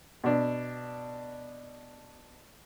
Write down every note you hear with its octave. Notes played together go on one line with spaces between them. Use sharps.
B2 D4